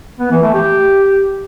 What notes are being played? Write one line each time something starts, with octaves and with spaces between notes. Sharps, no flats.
B3
E3
A3
G4